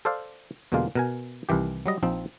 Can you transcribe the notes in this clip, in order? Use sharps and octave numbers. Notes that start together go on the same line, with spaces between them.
A4 C5 D5 F5
E2 B2 D3 G#3 A#3 F4
B2 A#4 G#5
C2 D#3 E3 G4
F#3 G3 D#5
A#1 F3 C4 D#4